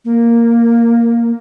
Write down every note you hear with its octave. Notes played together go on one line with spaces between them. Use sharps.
A#3